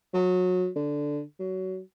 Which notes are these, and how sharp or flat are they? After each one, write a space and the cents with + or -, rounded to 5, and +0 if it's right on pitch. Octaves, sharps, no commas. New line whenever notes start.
F#3 -25
D3 -5
F#3 +20